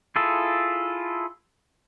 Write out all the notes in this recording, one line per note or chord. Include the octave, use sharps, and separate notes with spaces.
E4 F4 G#4 A4